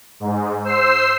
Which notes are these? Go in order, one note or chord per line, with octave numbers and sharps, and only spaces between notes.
G#2
C5 E6 C7